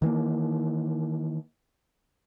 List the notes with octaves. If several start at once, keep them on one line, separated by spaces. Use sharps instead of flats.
D#3 E3 A3 A#3